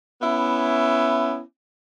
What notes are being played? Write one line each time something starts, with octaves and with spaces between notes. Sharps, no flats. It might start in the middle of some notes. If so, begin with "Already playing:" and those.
B3 C#4 E4